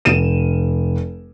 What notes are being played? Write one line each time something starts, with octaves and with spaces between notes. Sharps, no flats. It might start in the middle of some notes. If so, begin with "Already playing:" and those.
F1 D#7 E7